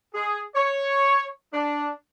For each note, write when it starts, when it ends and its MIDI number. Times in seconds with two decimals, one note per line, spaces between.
0.15 0.41 68
0.56 1.26 73
1.54 1.89 62